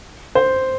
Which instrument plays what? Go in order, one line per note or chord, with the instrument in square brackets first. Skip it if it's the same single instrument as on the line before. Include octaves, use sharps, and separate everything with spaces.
[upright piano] C5